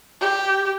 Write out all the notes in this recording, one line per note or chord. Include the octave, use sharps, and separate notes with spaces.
G4